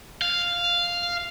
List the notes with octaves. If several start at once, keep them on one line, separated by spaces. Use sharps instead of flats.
F5